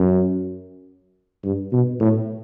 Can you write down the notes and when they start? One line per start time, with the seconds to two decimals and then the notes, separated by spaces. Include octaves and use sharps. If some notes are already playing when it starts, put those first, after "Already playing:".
Already playing: F#2
1.44 G2
1.72 B2
2.00 A2